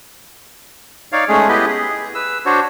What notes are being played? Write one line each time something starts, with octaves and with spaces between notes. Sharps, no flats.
D#4 C#5 D5 F5
G#3 A3 C#4 G#4
B3 E4 G4 B4 D#5
G#4
B4 E6
D4 F#4 C5 C#5